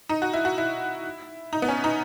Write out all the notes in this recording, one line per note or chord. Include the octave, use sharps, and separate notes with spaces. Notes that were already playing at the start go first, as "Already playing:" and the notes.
D#4
F#4
E4
F#4
E4
D#4
B3
C#4
D#4